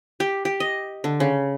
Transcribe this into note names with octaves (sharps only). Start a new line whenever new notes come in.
G4
G4
D#5
D3
C#3